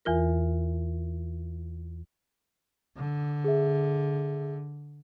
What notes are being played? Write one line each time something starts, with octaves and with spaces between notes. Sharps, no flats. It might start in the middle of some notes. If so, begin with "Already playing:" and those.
E2 E3 F4 A#4
D3
G#4 E5